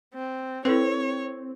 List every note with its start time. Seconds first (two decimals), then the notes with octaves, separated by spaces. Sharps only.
0.14 C4
0.65 C4 E4 A4 B4 C#5